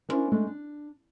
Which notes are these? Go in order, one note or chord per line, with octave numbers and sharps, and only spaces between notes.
B3 C#4 D4 E4 A#4 C5
G#3 A3 D4 A4
D4